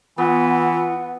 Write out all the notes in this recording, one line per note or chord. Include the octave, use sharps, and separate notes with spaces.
E3 B3 F4 F#5